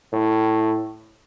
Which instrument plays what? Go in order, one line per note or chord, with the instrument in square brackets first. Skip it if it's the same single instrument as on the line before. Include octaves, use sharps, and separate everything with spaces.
[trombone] A2